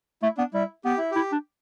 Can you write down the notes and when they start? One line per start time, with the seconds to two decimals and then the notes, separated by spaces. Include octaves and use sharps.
0.23 A3 E4
0.38 B3 D4
0.54 G3 E4
0.85 B3 G4
0.97 E4
1.11 E4 G4
1.32 D4